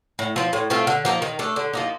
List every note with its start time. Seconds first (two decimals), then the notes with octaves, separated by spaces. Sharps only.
0.19 A2
0.36 F3 C4
0.53 A2
0.70 A3 C4 F4
0.87 D3
1.05 F3 A#3 D#4
1.22 D#3
1.39 A3 D4
1.56 D3
1.73 F3 A#3 D#4